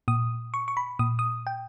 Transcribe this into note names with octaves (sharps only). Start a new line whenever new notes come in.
A#2 D#6
C#6
C#6
B5
A#2 D#6
D#6
G5